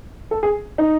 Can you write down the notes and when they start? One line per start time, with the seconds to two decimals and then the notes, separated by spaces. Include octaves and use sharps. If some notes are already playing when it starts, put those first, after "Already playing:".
0.31 A4
0.43 G#4
0.78 D#4